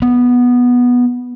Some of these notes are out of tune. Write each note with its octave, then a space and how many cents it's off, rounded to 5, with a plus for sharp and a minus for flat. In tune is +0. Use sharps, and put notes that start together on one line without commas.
B3 -10